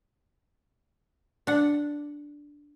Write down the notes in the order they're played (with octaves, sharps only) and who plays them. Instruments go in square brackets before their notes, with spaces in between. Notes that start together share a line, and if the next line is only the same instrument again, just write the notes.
[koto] D4 F#5